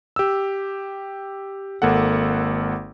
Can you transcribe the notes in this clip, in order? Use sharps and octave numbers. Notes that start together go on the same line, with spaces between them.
G4 E6
G#1 A#3 A4 F#5